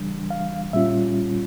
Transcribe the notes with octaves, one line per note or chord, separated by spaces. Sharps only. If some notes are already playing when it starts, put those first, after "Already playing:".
Already playing: C#3 E3 G3 D4
F5
A#2 G3 C#4 F4 E5